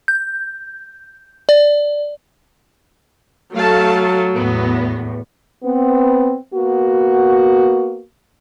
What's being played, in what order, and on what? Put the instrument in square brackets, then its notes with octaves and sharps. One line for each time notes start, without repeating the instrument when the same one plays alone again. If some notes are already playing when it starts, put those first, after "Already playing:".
[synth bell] G6
D5
[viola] F#3 [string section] A3 [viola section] F5 A5
[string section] E2 A2 [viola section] B3
[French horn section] B3 C4
A#3 B3 F#4